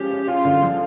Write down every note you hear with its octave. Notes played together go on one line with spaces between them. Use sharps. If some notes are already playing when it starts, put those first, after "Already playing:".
Already playing: F3 G#3 C#4 G4
C#4
C#4 F4
D3
F3